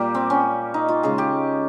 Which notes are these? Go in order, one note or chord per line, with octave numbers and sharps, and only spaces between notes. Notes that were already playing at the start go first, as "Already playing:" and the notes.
Already playing: A#2 G3 A#3 G4
C4
C#4
D#4
F4
C#3 G#3 G#4
G4